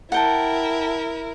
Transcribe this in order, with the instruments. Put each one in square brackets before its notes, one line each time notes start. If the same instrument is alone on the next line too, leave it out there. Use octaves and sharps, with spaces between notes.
[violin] E4 A#4 [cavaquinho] F#5 G5 A5